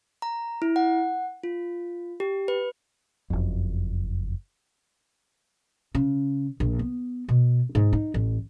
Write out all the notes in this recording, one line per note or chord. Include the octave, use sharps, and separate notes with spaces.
A#5
E4
F#5
F4
G4
B4
F#1 F2
C#3
A#1
B3
B2
G#2
D#4
A1